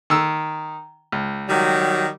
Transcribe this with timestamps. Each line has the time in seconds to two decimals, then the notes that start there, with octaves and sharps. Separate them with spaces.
0.10 D#3 E6
1.12 C#2
1.48 D#3 F#3 G3